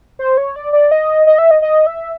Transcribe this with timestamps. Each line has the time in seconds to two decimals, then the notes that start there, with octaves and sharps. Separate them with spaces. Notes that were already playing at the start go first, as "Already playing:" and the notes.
0.19 C5
0.37 C#5
0.56 D5
0.73 D5
0.91 D#5
1.27 D#5
1.38 E5
1.51 D#5
1.62 D#5
1.87 E5